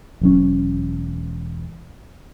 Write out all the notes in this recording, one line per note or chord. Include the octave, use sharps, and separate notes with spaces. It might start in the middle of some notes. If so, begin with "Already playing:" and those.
E1 F#3 C#4